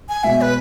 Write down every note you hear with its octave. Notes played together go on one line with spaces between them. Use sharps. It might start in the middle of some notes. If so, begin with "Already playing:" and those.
G#5
B2 G#3 B3 E5
B4